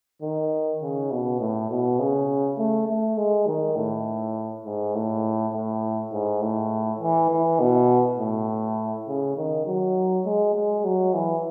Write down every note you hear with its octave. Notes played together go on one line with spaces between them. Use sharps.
D#3
C#3
B2
A2
B2
C#3
A3
A3
G#3
D#3
A2
G#2
A2
A2
G#2
A2
E3
E3
B2
A2
C#3
D#3
F#3
G#3
G#3
F#3
E3